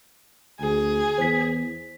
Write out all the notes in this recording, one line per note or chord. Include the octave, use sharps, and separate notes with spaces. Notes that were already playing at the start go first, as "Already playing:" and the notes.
D2 G#4
E2 C5 B6